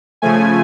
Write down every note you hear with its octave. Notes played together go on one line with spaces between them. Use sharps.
C#3 F3 A3 G#5